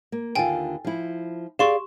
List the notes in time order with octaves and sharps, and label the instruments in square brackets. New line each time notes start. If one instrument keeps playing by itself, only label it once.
[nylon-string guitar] A#3
[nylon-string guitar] D#2 D3 F4 [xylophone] G5 G#5
[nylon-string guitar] F3 E4
[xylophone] G4 C6 C#6 [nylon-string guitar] G#4 D5 F5